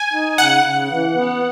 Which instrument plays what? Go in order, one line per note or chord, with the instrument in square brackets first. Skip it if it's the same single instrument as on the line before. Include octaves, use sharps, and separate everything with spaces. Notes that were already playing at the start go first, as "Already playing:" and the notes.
Already playing: [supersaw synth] G#5
[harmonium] D#4
[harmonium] C#3 [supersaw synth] F#5
[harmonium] C#3
E3
B3